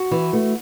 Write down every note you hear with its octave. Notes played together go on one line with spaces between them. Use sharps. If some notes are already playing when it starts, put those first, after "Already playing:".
Already playing: F#4
E3
A3